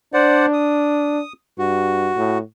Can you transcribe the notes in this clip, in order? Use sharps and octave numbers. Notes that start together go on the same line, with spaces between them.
D4 C5 D5 F#5
D#6
G2 F#4
A2